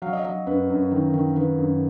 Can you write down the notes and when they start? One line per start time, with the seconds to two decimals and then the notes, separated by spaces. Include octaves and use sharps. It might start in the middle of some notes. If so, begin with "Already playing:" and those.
0.02 F#3 F5
0.13 D#5
0.24 F#3 D#5
0.47 F#2 B4
0.70 F#2
0.92 D#3
1.14 D#3
1.36 D#3 B4
1.59 F#2